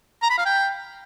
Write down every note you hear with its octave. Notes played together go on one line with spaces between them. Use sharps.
A#5
B5
F5
G5